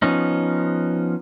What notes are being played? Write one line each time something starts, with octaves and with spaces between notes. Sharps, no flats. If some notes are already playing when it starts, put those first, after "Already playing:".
F3 B3 C#4 D#4